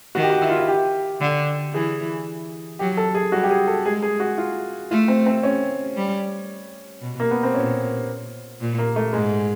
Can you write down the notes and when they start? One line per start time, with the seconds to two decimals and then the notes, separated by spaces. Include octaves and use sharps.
0.15 D#3 F#4
0.23 G4
0.30 F#4
0.42 E4
0.50 F4
0.58 E4
0.68 G4
1.21 D3
1.73 E3 G#4
2.79 F#3 G4
2.97 A4
3.15 G#4
3.32 G3 F#4
3.43 G4
3.50 G#4
3.67 A4
3.85 G#3 G#4
4.03 G#4
4.20 F#4
4.38 F4
4.91 A3 F4
5.08 C4
5.26 C4
5.43 C#4
5.97 G3
7.02 B2
7.20 A#3
7.31 B3
7.43 C4
7.54 A#2 C#4
8.61 A#2
8.78 A#3
8.96 A3
9.13 G#2 G#3